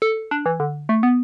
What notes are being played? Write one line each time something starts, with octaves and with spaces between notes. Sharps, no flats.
A4
D4
E3
D3
A3
B3